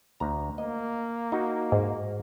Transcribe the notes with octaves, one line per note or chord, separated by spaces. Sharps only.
D2 A#5
A#3 D#5
D#4 F#4
G#2